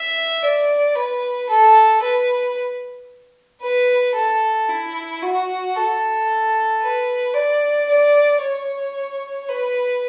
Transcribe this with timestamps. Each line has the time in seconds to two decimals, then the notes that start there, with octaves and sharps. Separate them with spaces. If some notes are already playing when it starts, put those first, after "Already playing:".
Already playing: E5
0.43 D5
0.95 B4
1.49 A4
2.03 B4
3.62 B4
4.15 A4
4.69 E4
5.23 F#4
5.76 A4
6.82 B4
7.35 D5
7.89 D5
8.42 C#5
9.49 B4